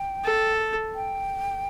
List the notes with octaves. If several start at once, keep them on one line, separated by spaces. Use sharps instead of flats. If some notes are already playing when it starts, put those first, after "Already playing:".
Already playing: G5
A4
G5